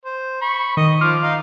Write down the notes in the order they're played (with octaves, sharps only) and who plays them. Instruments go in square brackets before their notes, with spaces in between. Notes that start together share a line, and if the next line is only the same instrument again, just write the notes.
[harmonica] C5
B5 C#6
[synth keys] D#3 [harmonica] D#5
[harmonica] F3 [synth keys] C6 D6 F6
[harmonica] D#4 F5